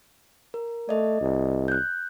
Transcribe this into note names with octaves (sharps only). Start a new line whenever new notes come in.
A#4
A3 D5 D#5
C2
F#6 G6